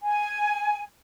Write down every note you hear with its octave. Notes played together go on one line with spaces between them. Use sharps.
G#5